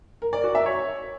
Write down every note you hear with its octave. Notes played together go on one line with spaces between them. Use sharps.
A#4
D5
F#4
E5
C#5